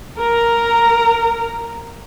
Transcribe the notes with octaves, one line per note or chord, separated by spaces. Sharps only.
A#4 A#5